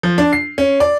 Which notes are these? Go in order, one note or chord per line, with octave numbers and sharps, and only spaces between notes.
F3
D4
C7
C#4
D5